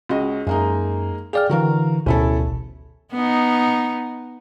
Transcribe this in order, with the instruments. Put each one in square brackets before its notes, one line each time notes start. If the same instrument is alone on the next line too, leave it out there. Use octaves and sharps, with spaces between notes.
[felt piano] C#2 F#4 D#5
[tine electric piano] F#2 [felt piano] G#3 A#3 D#4
[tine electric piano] G#4 D5 F6 [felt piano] F5 G5
[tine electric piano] D3 E3 [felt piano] F#4 A#4 F5
[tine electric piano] A1 D2 B2 [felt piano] C#4 E4 A4
[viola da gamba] B3 D#4